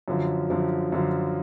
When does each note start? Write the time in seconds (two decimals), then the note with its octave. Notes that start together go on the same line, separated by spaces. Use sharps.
0.08 F#2 D3 F3
0.50 F#2 D3 F3
0.92 F#2 D3 F3